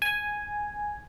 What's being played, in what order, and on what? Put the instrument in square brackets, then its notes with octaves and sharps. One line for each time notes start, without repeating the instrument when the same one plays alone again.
[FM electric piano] G#5